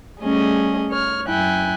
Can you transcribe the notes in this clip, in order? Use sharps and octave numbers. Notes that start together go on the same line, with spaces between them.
G3 A3 C#4 G#4 D#5
C#5 F6
F#2 E4 G5 G#5 F#6